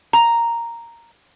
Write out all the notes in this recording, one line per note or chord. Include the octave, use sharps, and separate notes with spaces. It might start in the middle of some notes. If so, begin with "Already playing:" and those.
A#5